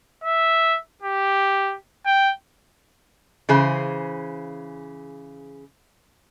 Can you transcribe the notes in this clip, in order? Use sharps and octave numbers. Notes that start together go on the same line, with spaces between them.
E5
G4
G5
C#3 E3 G#4 C5